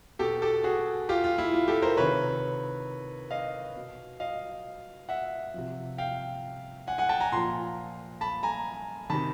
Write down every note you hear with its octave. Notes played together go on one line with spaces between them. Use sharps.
B2 G4 A4
G4 A4
F#4 G#4
F4 G4
F4
E4
F4
G4 A4
A#4 C5
C3 D#3 B4 C#5
D#5 F5
B2
D#5 F5
E5 F#5
C3 F3
F5 G5
F#5 G#5
F#5 G#5
G5 A5
G#5 A#5
A#2 F3 A#5 C6
A5 B5
G#5 A#5
C3 D#3 A5 B5